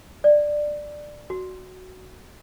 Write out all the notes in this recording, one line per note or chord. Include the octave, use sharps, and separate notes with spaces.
D5
F#4